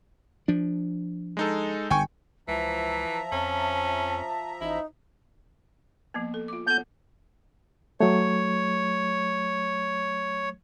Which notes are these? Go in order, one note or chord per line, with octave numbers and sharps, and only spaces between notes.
F3 D4
G#3 D#4 A4
G1 G2 G5 G#5 C#6
C#2 E3 F3 E5 A5 A#5
F2 C#4
A1 D#4 E4
F3 A#3 B3
A4
F4 D6
B3 A4 F#5 G6
F#3 A3 C#5